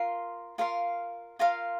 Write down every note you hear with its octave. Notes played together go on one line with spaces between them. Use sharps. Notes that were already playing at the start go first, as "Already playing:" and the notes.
Already playing: F4 A#4 C6
F4 A#4 F5 C6
F4 A#4 F5 C6